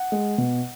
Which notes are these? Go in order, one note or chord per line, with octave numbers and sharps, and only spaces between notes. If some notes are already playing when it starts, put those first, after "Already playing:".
Already playing: F#5
G#3
B2